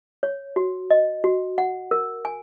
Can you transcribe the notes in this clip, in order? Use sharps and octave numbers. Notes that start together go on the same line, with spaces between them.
C#5
F#4
D#5
F#4
F#5
A#4
G#5